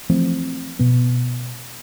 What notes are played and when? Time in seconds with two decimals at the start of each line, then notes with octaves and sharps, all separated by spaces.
0.09 E3 F3 A3 C4
0.79 B2 B3